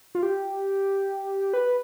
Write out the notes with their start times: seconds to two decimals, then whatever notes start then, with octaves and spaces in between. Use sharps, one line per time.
0.15 F4
0.23 G4
1.53 B4